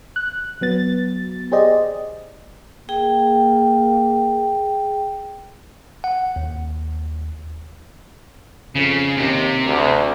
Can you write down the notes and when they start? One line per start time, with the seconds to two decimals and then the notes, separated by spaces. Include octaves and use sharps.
0.16 F#6
0.61 F#3 B3 A6
1.52 G4 G#4 C5 D5 D#5
2.89 A#3 G#4 G5
6.04 F#5
6.36 D#2
8.75 F2 C#3
9.17 D#2 C3
9.65 D2